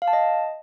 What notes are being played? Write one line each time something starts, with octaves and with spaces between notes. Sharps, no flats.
F5
A5
D#5